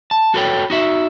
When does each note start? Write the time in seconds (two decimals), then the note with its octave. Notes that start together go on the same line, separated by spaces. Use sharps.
0.11 A5
0.34 F#4 A4 B4 C#5 G5
0.70 D#4 F#4 E5